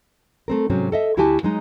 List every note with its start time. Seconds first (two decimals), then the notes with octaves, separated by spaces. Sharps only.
0.48 A3 C4 A#4
0.70 G#2 C3 F#3 C4 C#4
0.92 A4 D#5 E5
1.17 D2 E4 F#4 G4 G#5 A5
1.43 F#3 G#3 D#4